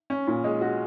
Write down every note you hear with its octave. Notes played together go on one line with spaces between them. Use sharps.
C#4
A#2
G#3
F#4